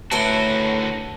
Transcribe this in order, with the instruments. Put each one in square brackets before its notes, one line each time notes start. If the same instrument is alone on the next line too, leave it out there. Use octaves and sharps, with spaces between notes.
[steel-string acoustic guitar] F#2 A2 B4 [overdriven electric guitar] D3 F#4 [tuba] A3 [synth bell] A5 G7